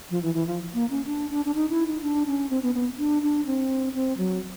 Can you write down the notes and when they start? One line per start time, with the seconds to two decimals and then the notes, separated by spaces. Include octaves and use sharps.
0.10 F3
0.22 E3
0.34 E3
0.47 F3
0.74 A#3
0.90 C#4
1.06 D4
1.30 D4
1.45 D4
1.55 D#4
1.70 E4
1.87 D#4
2.02 D4
2.27 C#4
2.50 C4
2.63 B3
2.75 B3
2.98 D4
3.22 D4
3.46 C4
3.94 C4
4.18 F#3